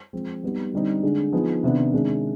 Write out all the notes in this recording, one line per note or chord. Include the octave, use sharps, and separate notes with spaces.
F3 G#3 C4
G3 B3 D#4 G4
D3 G3 C4 D#4
D3 G#3 D4
F3 B3 D#4 G#4
C3 D#3 B3 D4
C3 D#3 G#3 D4